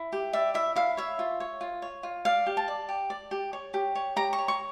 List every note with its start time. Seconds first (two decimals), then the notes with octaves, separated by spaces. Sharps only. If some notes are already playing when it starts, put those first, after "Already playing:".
Already playing: E4
0.13 G4
0.33 D5 E5
0.54 E4 E5
0.76 E4 F5
0.97 C#5 E5
1.19 F4
1.40 C#5
1.61 F4
1.82 C#5
2.03 F4
2.25 D5 F5
2.46 G4
2.57 A5
2.68 D5
2.89 G4
3.10 D5
3.31 G4
3.53 C#5
3.74 G4
3.95 C#5
4.16 G4 A#5
4.33 C#6
4.38 C#5
4.48 C#6